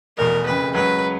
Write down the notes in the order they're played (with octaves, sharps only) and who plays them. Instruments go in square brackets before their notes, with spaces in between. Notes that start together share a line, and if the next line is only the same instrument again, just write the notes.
[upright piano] F1 E2 B2 [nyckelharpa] A#4
[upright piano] F#1 F2 C#3 [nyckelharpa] B4
[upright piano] C#2 C#3 F#3 [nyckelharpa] B4